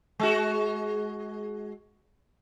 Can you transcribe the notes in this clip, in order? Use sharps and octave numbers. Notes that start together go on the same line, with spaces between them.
G#3 F#4